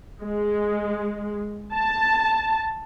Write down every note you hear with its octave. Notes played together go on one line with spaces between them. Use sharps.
G#3
A5